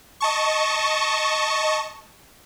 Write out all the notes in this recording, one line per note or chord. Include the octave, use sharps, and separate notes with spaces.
D#5 A5 C#6